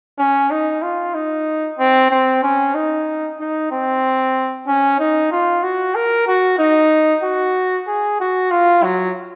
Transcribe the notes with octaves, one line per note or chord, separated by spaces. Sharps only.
C#4
D#4
F4
D#4
C4
C4
C#4
D#4
D#4
C4
C#4
D#4
F4
F#4
A#4
F#4
D#4
F#4
G#4
F#4
F4
F#3